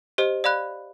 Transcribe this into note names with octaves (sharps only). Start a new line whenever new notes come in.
G4 C5 D#5
D5 F5 B5 F#6